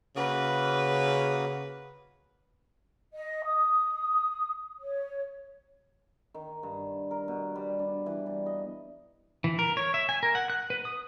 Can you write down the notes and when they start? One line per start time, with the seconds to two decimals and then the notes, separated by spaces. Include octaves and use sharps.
0.16 C#3 A#3 F#4 B4 D#6
3.13 D#5
3.44 D#6
4.80 C#5
6.34 D#3
6.63 G2
7.11 A#4
7.28 B2
7.55 G3
7.79 D4
8.06 E3
8.26 G3
8.46 D#5
9.44 E3
9.59 A#4
9.77 C#5
9.94 E5
10.09 G#5
10.23 A#4
10.35 F#5
10.50 F#6
10.70 B4
10.85 D#6